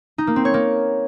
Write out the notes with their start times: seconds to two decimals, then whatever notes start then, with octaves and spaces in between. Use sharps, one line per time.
0.18 D#4
0.27 A#3
0.36 C4
0.45 C#5
0.54 A#3